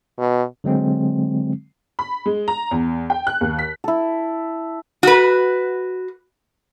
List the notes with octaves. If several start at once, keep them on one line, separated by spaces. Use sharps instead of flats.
B2
D3 F#3 G#3 C4
B5
G#3
A#5
E2
G5
F#6
D#2
B6
E4 A4
F#4 B4